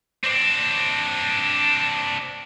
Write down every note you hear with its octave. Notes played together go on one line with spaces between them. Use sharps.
C4 D4